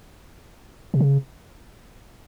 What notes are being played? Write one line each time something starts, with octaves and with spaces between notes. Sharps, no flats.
C3
C#3